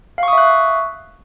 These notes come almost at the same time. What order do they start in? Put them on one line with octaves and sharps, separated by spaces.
F5 C#6 D#6 E5 F#6